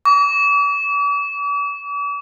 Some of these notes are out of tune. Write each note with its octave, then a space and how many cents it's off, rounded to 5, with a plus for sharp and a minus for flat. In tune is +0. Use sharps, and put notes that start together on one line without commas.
D6 -45